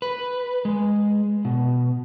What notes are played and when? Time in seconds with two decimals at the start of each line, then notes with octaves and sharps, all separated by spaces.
0.02 B4
0.65 G#3
1.45 B2